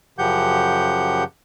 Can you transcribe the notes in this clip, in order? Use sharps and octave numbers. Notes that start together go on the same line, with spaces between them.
F#2 C#3 F3 G4 F#5 G6